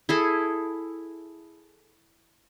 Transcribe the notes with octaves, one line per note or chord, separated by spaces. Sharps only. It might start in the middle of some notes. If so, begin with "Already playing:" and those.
E4 G#4 A4